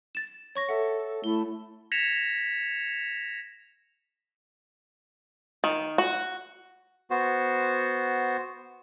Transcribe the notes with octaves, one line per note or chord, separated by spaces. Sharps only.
A6 E7
C#5 C#6 A#6
A4 E5 F#5
A3 E4 G7
G#6 A#6 B6 C#7 E7 F7
D#3
F#4
B3 F#4 C5